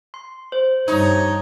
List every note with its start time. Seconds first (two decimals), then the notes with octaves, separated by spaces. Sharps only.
0.14 C6
0.52 C5
0.88 G2 D#4 C#5